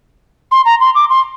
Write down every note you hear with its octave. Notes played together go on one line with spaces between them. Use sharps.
C6
A#5
C6
D6
C6